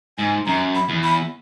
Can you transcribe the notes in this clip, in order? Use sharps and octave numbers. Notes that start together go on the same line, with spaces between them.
G#2 G#5
F#2 A#5
B5
E2
B5